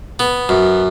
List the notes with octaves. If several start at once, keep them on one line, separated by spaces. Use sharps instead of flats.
B3
F#2